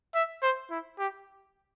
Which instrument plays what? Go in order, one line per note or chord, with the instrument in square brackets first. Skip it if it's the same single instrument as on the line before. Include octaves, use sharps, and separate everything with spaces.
[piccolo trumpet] E5
C5
E4
G4